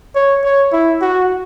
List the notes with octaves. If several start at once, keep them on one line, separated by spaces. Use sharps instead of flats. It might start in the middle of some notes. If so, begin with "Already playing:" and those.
C#5
C#5
E4
F#4